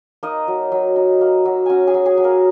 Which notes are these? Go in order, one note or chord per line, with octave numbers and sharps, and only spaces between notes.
A#3 D#4 D#5
F#3
F#3
D#4
A#3
F#3
C#4 F#4 F#5 G#5
G#4 G#5
F#3
G#4 G#5
F#3
A#3 A#4